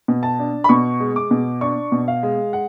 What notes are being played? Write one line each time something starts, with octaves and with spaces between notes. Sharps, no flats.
B2
A5
D4
B5
B2 C#6
G#3
D6
B2
D4 C#6
B2
F5
G#3
F#5